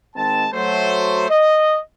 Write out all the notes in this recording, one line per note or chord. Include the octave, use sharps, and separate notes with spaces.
D#3 G#3 C4 A5
F#3 A3 C5
D#5